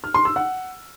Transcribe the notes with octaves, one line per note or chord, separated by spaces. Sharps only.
F6
C6
E6
F#5